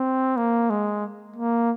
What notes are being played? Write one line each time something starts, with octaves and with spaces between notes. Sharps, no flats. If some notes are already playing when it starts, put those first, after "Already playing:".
Already playing: C4
A#3
G#3
A#3